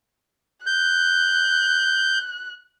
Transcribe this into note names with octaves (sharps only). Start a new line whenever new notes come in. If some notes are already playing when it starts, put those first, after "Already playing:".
F#6 G6